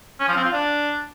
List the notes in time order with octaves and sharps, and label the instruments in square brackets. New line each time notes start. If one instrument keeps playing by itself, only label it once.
[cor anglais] C#4
F3
C4
F4
D4